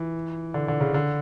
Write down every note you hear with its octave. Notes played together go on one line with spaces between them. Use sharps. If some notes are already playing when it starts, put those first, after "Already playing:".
Already playing: E3
D3
D3
C#3
D3